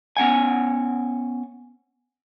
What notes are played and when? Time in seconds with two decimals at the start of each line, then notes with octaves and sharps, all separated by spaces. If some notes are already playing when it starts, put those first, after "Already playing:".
0.17 B3 C#4 F#5 G#5